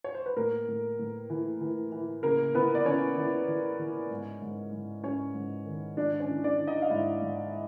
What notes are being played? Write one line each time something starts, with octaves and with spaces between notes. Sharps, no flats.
C#5
C5
B4
A2 A#3 A#4
A2
A2
E3
E3
E3
C#3 A#3 A#4
E3 B3 B4
D5
E3 C#4 C#5
E3
E3
E3
G#2
G#2
G#2
G#2 C#4 C#5
G#2
D#3
G#2 D4 D5
C#4 C#5
E3
D4 D5
E3
D#4 D#5
F5
G#2 E4 E5
G#2